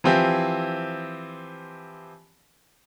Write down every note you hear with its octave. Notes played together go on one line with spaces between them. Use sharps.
E3 F3 C4 E4 G4